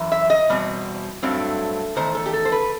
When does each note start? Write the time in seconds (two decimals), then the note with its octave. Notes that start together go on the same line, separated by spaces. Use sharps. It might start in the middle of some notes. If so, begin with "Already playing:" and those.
Already playing: F#2 E3
0.12 E5
0.30 D#5
0.49 E2 B2 G3 C4
1.23 G2 F#3 A3 C4
1.96 E2 D#3 A3 C5
2.15 A4
2.26 G4
2.33 A4
2.45 C5
2.52 B4